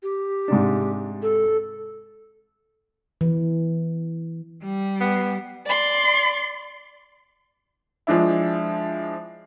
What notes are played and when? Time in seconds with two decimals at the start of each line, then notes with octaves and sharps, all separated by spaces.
0.03 G4
0.48 G#2 C3 D4
1.22 A4
3.21 E3
4.63 G3
5.01 B3
5.66 D5 C6
8.07 F3 G#3 D4 E4